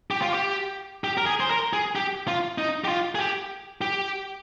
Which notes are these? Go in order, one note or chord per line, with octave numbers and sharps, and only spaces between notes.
G4
F4
G4
G4
A#4
G#4
C5
A#4
G#4
G4
F4
D#4
G4
F4
G#4
G4
G4